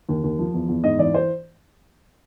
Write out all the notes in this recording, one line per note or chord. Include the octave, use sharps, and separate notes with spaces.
D#2
D#2
F3
E2
E2
G#2 D#5
E3 D5
C5